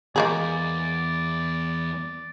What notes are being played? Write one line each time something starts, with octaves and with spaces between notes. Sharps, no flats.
E2 E3 G#3 A#3 G#4 D5